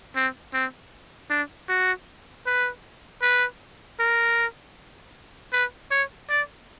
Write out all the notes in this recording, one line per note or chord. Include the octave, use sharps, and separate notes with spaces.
C4
C4
D4
F#4
B4
B4
A#4
B4
C#5
D5